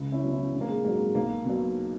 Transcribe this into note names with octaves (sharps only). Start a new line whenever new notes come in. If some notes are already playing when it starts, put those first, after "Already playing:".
Already playing: C#2
C#4 E4
B2 F#3
C#4 E4
A#1
A#3
G#3
G#2 F#3 A#3
G#3
B1 A#3
B2 F#3